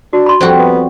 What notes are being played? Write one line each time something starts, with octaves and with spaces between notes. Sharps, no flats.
D4 F#4
B5 C6
F2 G3 C4 F#4
B3